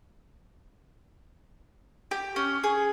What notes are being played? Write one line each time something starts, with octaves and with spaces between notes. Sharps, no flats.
G4
C#4
G#4